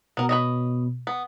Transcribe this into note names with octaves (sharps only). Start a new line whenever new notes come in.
B2 B3 A#4
B4 C#5 D#5
B3